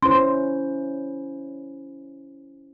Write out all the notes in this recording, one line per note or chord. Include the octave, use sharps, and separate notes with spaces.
C#4 E4 C5 C6